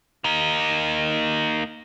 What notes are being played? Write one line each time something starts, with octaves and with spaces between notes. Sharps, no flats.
A#3 D#4